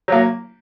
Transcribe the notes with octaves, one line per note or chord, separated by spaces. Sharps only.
F#3 A#3